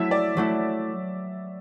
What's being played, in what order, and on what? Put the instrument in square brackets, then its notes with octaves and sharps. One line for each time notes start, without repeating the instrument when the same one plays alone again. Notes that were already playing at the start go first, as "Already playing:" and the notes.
Already playing: [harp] F#3 A3 E4 [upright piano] E5
[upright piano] D5
[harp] F#3 A3 E4